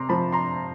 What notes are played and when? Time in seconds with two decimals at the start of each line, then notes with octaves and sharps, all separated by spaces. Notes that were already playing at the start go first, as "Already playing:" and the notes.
Already playing: C3 A#5 C6 D6
0.09 F3 A5 B5
0.32 A#5 C6